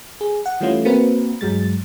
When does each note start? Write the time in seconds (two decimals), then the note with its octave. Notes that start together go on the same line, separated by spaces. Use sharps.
0.21 G#4
0.46 F#5
0.61 E3 G3 A3 C#4 E4 F4
0.85 A#3 C4 F#4 A#4 B4
1.41 G2 F#3 G#3 A6